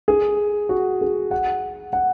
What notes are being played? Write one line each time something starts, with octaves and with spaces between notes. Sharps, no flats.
G#4
F#4
G#4
F#5
F#5